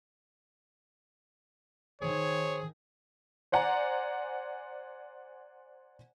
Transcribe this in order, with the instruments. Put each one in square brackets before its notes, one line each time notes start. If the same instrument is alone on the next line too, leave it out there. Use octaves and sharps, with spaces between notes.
[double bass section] D#3 [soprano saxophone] G#4 [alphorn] C5 [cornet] C#5
[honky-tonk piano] C5 D5 F#5 G#5 A#5